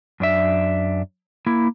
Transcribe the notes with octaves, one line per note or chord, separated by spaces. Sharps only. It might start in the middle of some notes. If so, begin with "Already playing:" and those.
F#2 D4 E5
A#3 E4